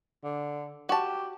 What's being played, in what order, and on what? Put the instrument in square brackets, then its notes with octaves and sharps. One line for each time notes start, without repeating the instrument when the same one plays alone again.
[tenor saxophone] D3
[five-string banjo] F#4 A5 [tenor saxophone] G4